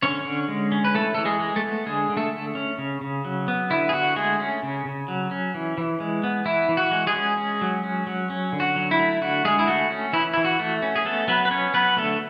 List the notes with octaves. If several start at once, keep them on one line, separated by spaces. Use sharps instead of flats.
D3 C#4 C#5
D3
G#3
C#4
B4
E3 A3 A4
E3 A4
G#3 G#4
G#3
A3 A4
B3
D3 G#3 G#4
D3
A3 A4
A3
C#4
C#3
C#3
F#3
B3
D3 E4
G#4
D3 F#4
G#3 A3 G#4
C#4
C#3
C#3
F#3
C#4
E3
E3
G#3
B3
E3 E4
E3
F#4
G#3
G#3 G#4
C#4
C#4
F#3
C#4
F#3
C#4
D3
F#4
F#3
E4
A3
D3 F#4
D3 G#3 G#4
E4
A3 F#4
C#4
E3 E4
E3 E4
F#4
A3
C#4
G#4
A3 B3 A4
F#3 B3 B4
B4
B3 C#4 C#5
F#3 B3 B4
D3 A3 A4